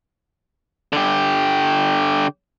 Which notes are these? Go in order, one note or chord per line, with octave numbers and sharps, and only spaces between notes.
D3 G4